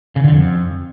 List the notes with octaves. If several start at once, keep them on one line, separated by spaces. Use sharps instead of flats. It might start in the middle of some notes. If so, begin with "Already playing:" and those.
C#3
D3
F2